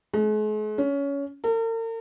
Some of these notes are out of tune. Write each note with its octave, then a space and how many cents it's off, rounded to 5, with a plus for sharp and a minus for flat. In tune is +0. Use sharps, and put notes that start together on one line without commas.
G#3 +45
C#4 +20
A#4 -45